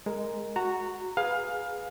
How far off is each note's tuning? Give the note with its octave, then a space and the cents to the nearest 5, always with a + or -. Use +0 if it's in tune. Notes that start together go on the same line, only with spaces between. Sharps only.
G#3 +0 A#4 +0
F#4 +0 A#5 -20
G#4 +0 B4 +0 F5 +20